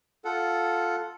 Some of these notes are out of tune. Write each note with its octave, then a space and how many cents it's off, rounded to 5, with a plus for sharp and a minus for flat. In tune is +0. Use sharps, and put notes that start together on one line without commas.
F4 +0 A4 -5 F#5 -5